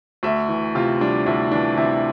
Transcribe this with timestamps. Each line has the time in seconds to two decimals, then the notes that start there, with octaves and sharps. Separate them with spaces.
0.23 D2 E5
0.49 E3
0.75 C3 F4
1.01 G3 D4
1.26 D2 E4
1.51 E3 D4
1.77 C3 E4